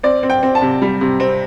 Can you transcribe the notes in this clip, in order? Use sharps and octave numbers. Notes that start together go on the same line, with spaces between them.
C4 D5
C4
G5
C4
A5
C3
G3
C3
C4